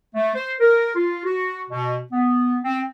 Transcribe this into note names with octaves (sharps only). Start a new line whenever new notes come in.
A3
C5
A#4
F4
F#4
B2
B3
C4